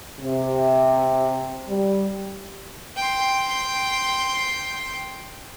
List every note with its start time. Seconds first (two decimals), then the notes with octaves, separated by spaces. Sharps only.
0.20 C3
1.68 G3
2.96 G5 C6